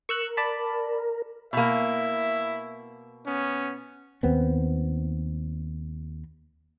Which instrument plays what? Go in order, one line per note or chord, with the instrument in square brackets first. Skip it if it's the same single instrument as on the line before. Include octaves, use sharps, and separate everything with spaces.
[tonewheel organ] A#4 [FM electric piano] C#6 E6 F#6
[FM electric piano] D5 A5 B5
[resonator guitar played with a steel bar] B2 A#3 [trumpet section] E4 E5
[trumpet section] B3 C#4
[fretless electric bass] D#2 B3 C4